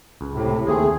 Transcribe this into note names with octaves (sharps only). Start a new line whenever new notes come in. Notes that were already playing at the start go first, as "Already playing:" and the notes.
C#2
A2 C3
D#2 A3 C4 G#4